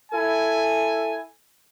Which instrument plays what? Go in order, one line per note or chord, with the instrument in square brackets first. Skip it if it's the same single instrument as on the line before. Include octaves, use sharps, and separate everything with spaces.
[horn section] E4 A4 G#5